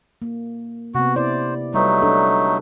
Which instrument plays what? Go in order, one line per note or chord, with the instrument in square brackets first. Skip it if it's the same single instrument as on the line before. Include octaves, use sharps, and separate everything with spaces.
[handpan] A#3
[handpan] C3 B3 [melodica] F#4
[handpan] E4 D5 [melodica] C5
[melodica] F#3 A3 D#4 [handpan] G3 B4
[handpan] D4 A4